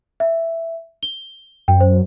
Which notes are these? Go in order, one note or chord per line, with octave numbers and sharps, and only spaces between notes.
E5
G7
F#2 G5
C5